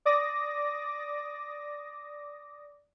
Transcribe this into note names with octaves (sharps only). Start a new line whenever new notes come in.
D5 D6 D#6 A#6